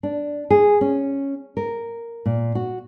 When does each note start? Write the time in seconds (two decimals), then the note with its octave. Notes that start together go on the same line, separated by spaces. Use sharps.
0.03 D4
0.50 G#4
0.81 C#4
1.57 A#4
2.26 A#2
2.55 F#4